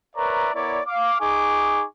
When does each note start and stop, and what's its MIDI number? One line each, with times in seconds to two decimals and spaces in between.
0.16 0.49 70
0.16 0.49 71
0.16 0.49 73
0.16 0.49 74
0.16 0.49 76
0.16 0.49 82
0.54 0.79 59
0.54 0.79 64
0.54 0.79 70
0.54 0.79 73
0.54 0.79 74
0.86 1.16 77
0.86 1.16 86
1.20 1.84 63
1.20 1.84 68
1.20 1.84 80
1.20 1.84 85
1.20 1.84 86